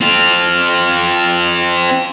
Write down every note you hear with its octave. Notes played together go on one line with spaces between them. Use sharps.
C4 F4